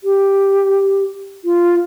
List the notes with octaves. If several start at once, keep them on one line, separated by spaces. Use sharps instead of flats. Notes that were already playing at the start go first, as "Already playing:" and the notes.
G4
F4